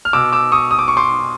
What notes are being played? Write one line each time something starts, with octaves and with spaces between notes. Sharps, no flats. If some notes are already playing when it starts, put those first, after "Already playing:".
F6
B2 D6 E6
D6 E6
C#6 D#6
D#6
D6
C#6
C6 D6